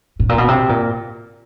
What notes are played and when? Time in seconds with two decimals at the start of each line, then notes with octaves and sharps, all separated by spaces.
0.20 A2
0.29 A#2
0.38 B2
0.48 C3
0.69 A#2